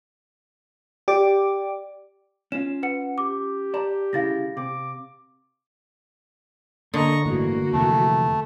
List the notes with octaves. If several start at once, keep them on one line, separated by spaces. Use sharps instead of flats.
G4 D5 D6
C#4 F4 E7
B4 F#5 C#7
G4 D6
D5 A5 A#5
C2 C#3 E4 F5 A6 A#6
C3 D6
D3 A#3 D#5 A#5 C#6
G1 A2 E3 A#3 F#4
F2 C3 E3 A3